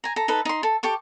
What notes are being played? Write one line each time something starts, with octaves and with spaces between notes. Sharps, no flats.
G#5 A#5
A4 A#5
D#4 A4 B4
D#4 C6
A4
G4 A4 C#6 D6